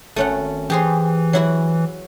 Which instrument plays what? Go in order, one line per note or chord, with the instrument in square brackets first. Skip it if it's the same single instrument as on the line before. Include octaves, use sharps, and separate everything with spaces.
[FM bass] G#1 [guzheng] A3 C#4 F#5
[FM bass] E3 [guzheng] G4 G#4 C5
[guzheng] F#3 E4 F#4